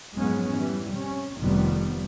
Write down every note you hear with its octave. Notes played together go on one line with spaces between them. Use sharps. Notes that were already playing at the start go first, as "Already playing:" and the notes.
F2 G#2 F#3 G#3 B3 C#4
E3 G3
C3 C#4
F1 F2 D#3 F3 G3 B3